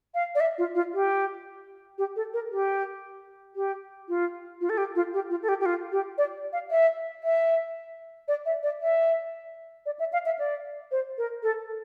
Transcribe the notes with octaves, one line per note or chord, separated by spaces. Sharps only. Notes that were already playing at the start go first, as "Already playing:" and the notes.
F5
D5
E5
F4
F4
G4
G4
A4
A#4
G4
G4
F4
F4
A4
G4
F4
G4
F4
A4
G4
G4
F4
G4
D5
F5
E5
E5
D5
E5
D5
E5
D5
E5
F5
E5
D5
C5
A#4
A4